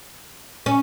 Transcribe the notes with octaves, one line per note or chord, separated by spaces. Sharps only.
C#4